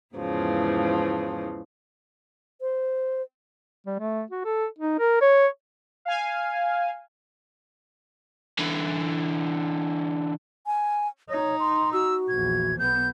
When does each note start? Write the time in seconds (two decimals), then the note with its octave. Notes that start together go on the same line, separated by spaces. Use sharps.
0.15 E2 G#2 C#3 E3 F3
2.60 C5
3.87 G3
3.99 A3
4.31 F#4
4.45 A4
4.79 D#4
4.99 A#4
5.21 C#5
6.05 F5 G#5
8.59 D3 E3
10.66 G#5
11.30 D#4 C#5
11.60 C6
11.93 F#4 E6
12.29 A#1 E2 G#6
12.79 B1 B3 G6